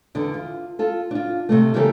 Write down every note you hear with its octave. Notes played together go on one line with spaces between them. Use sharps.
E2 D3 D4
F4
F4 A4
D4 F4
C3 G3 A3
C#3 E3 G3 A#3 G4 A4